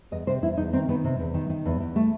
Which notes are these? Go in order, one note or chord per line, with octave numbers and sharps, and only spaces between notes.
E2 D#5
C3 C5
E2 E4
E2 D#4
D#3 C4
D#3 B3
C3
E2
D#3
D#3
E2
E2
A3